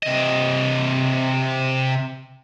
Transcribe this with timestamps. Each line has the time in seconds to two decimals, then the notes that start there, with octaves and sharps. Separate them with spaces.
0.03 C3 D#5